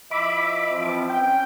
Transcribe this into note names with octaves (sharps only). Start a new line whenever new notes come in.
F3 E4 D#5 E5 B5 D6
E3 F3 C4
C#4 G5